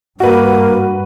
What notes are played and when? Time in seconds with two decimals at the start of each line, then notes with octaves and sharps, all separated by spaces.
0.20 G2 A#3 F#4 B4